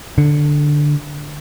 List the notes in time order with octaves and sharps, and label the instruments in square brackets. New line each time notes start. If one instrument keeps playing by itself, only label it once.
[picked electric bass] D3